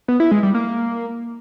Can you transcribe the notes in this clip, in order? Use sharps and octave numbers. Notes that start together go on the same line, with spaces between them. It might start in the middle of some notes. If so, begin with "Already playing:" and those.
B3
E4
G#3
G3
A#3